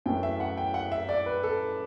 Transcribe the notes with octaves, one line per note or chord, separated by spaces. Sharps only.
F#2 E3 A3 G5
E5
F#5
G5
F#5
E5
D5
B4
A4